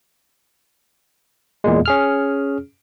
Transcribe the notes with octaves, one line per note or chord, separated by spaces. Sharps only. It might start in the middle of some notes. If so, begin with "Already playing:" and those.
E2 A#2 G#3
C#4 G#4 F6